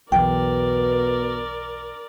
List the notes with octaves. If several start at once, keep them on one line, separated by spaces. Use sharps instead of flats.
B1 E2 B2 A#4 D5 G5